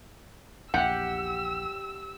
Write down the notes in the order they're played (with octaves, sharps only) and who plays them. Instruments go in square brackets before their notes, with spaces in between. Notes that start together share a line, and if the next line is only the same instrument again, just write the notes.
[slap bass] A#1 E2 [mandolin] G4 [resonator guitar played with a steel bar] F#5 [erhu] E6